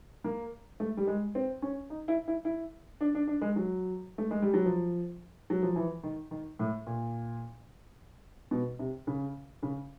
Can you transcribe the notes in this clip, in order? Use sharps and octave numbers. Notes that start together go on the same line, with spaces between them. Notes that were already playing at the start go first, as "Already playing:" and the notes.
A#3
A3
G3
G#3
C4
C#4
D#4
E4
E4
E4
D4
D4
D4
G#3
F#3
A3
G#3
G3
F#3
F3
F#3
F3
E3
D#3
D#3
A2
A#2
B2
C3
C#3
C#3